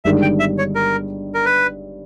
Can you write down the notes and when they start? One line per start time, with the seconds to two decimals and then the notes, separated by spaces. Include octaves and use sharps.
0.05 G1 G2 D#3 G#3 E5
0.22 G5
0.39 E5
0.58 C#5
0.75 A#4
1.35 A#4
1.46 B4